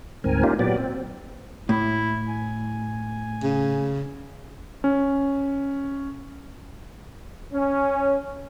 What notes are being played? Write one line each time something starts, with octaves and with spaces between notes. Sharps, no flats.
D2 G#2 C4 A#4 G#5
A#3 C#4 D#4 F4 G4
A#2 F#3 B3 G4 D5
C4
A2 E4
G#5
C#3
C#4
C#4